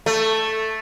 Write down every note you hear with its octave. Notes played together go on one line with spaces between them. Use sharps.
A3